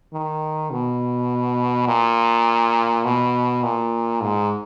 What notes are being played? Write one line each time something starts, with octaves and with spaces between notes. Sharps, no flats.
D#3
B2
A#2
B2
A#2
G#2